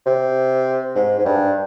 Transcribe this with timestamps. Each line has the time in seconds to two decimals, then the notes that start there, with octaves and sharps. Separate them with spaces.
0.06 C3
0.95 G#2
1.19 G#2
1.25 G2